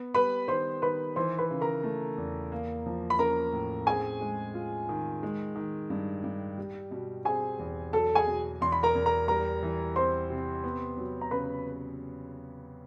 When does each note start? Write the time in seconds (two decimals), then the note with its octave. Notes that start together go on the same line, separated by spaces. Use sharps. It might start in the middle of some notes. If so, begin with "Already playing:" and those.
Already playing: B3
0.14 G3 B4 B5
0.48 D#3 C5 C6
0.82 D#3 B4 B5
1.16 E3 C5 C6
1.39 B4 B5
1.51 C#3
1.61 A#4 A#5
1.83 A3
2.18 E2
2.52 A#3
2.86 F3
3.10 B5
3.19 C#4 A#4 A#5
3.53 A2
3.86 C4 G#4 G#5
4.21 G#3
4.54 F4
4.89 D#3
5.23 G#3
5.56 D#3
5.90 G2
6.24 G2
6.58 G3
6.91 B2
7.25 C4 G#4 G#5
7.59 E2
7.93 F#3 A4 A5
8.15 G#4 G#5
8.27 B2
8.61 E2 C6
8.72 B5
8.83 A#4 A#5
8.95 E2
9.06 A#4 A#5
9.28 G3 A#4 A#5
9.62 E3
9.96 C4 C5 C6
10.30 C3
10.64 B3
10.97 F#3
11.21 A#5
11.31 C#3 B4 B5